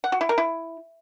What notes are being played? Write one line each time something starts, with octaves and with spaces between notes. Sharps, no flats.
F#5
F#4
E4
A#4
E4